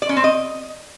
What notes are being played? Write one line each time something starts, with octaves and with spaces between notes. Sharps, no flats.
D5
C#4
C4
D#5